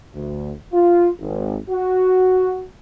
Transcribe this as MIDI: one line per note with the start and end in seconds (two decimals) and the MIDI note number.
0.14 0.52 38
0.73 1.08 65
1.20 1.57 32
1.69 2.62 66